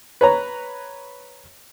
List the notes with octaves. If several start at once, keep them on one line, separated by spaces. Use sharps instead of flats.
B4 C#5 A#5